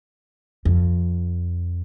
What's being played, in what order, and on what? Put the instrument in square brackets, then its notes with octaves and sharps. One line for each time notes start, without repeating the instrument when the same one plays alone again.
[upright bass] F2